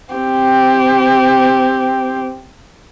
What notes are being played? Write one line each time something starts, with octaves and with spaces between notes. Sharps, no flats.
C4 G4